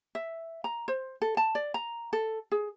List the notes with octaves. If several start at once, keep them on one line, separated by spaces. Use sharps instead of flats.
E5
A#5
C5
A4
A5
D5
A#5
A4
G#4